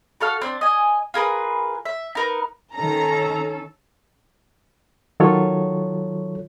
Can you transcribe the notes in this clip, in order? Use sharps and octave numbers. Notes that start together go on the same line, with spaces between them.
F#4 A4 F5 F6
C4 D4
D#5 G#5
F4 G#4 A#4 B4
E5
D#4 A#4 B4
D#3 C#4 A4 A#5
D#3 F#3 F4 A4 C#5